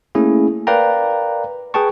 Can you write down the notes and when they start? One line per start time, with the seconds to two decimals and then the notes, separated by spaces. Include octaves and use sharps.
0.15 A3 A#3 C#4 E4 G#4
0.67 A#4 B4 D5 F5 G5 A#5
1.74 G#4 B4 G5 A5 C#6